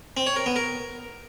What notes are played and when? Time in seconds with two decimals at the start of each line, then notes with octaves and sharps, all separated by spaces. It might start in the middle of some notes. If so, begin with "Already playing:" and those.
0.17 C4
0.26 C#5
0.36 A#4
0.46 B3
0.56 A#4